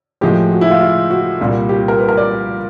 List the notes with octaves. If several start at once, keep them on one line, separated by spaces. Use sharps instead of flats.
A2 F3 G#3 G4
F#4
E4
F4
F4
F#4
C2 A#2 G3
G4
A#4
B4
A#4
D5